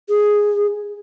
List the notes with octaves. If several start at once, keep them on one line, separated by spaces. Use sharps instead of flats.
G#4